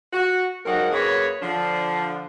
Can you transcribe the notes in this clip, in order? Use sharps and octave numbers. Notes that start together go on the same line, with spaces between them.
F#4
F2 G#2 F#3 D#4 A#4 F#5
F#2 A#3 G#4 B4 C#5
D3 F3 D4